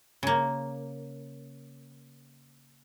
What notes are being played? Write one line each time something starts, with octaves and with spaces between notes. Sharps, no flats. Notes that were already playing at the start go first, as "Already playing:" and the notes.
C#3 A#3